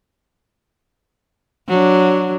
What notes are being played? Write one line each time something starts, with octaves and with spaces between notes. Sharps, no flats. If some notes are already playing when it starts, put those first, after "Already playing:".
F#3 D4